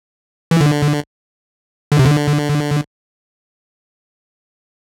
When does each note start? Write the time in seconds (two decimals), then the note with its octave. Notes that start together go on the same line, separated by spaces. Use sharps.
0.51 E3
0.61 D3
1.92 D3
1.99 C3
2.06 D3